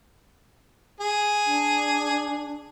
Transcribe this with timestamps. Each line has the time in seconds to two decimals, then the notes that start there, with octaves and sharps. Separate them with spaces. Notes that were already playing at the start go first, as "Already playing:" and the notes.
1.01 G#4
1.46 D4